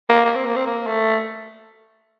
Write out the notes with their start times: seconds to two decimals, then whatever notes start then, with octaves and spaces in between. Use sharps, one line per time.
0.09 A#3
0.25 A#3
0.35 C4
0.45 A#3
0.56 C4
0.66 A#3
0.87 A3